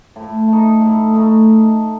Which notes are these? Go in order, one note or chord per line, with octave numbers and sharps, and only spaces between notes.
A2
A3 D#4
A2
A3 D#4